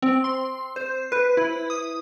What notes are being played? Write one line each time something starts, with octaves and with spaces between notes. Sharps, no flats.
C4
C6
C5
B4
E4
D#6